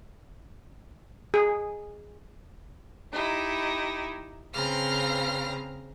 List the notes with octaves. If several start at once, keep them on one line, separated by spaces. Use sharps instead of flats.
G#4
D#4 E4 G4
C#3 C4 B4 F5 A#5 F6